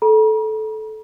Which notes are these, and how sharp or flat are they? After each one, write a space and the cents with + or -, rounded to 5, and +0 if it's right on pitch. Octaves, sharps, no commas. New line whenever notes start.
A4 -15 A#5 +45